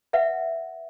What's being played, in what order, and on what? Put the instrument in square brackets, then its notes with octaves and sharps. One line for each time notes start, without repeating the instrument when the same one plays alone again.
[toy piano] B4 E5 F#5